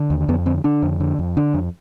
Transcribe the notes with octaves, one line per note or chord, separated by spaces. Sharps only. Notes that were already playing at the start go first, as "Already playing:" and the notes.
Already playing: D3
D#2
F2 B3
D3 C4
D3 D4
F2
D3
F2
D3 D4
F2